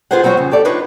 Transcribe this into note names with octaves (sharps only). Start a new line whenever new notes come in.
F4 G4 G#4 B4 C5 F#5
F#3 G3 C4 F#4 G4 C#5
F2 C#3
G4 A4 D5
D4 D#4 F4 B4 C#5